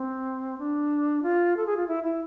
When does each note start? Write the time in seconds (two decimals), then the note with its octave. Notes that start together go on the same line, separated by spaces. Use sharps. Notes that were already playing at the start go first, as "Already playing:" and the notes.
Already playing: C4
0.58 D4
1.23 F4
1.57 A4
1.66 G#4
1.77 F4
1.88 E4
2.04 E4